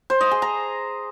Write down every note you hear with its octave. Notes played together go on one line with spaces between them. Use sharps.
C5
D#5
G#4
A#5